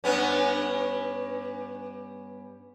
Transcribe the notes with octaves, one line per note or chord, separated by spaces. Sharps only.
G2 B3 C#4